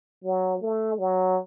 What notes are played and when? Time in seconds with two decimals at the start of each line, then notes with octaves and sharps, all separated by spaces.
0.24 F#3
0.61 A3
0.99 F#3